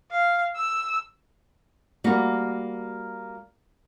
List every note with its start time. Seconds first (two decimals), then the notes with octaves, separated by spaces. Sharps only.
0.11 F5
0.56 E6
2.04 G3 A#3 F#4